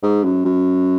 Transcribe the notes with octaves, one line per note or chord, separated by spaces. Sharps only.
G#2
F#2
F#2